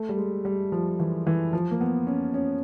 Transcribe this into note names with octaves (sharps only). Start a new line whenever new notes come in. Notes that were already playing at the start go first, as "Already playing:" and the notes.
Already playing: A3
G3
G#3
G3
F3
E3
E3
F3
A#3
B3
C#4
C#4